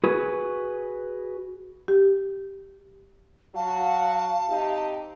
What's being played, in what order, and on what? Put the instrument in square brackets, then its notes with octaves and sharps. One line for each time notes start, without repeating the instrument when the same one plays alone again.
[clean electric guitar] F#4 G#4 B4
[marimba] G4
[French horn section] F#3 F#4 [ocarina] F5 [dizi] A5
[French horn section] C3 D#4 G4